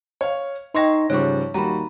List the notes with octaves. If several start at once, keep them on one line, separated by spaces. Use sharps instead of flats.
C#5 F5
D#4 B4 D#5 G5 C6 C#6 A#6
G#2 C#3 F3 G3 C#5 C#6
D#2 G3 F#4 A#5 B5